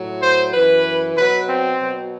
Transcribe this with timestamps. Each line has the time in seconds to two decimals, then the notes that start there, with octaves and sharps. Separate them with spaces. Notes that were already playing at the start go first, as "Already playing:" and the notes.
Already playing: A2 F#3
0.21 C5
0.53 F#2 E3 B4
1.16 B2 F#3 B4
1.48 C4
1.80 B2 F#3